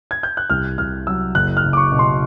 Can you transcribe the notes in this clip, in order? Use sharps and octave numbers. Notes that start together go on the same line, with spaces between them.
G#6
G6
F#6
C2 F6
C2 F6
F#3 E6
F#1 F#6
F6
F#1
D6
C#6
B2
C6